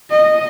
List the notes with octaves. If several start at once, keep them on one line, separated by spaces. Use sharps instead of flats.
D#5